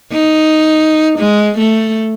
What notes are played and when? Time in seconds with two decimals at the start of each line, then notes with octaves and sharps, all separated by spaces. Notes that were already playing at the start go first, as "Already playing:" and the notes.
0.13 D#4
1.19 G#3
1.58 A3